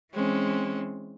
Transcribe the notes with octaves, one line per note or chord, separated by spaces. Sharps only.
E3 G#3 C4 C#4